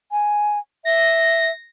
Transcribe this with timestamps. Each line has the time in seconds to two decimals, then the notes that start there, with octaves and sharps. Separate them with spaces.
0.12 G#5
0.85 E5 A#6